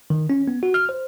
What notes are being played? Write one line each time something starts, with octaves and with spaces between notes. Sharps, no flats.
D#3
C#4
B3
F#4
F6
C5